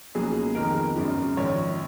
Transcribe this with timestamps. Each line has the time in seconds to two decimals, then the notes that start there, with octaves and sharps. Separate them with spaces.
0.15 C#2 B2 F#3 A#3 G#4
0.55 F2 D#3 G#3 B3 A#4
0.96 G#1 F#2 C#3 F#3
1.37 A#1 G#2 D#3 C#5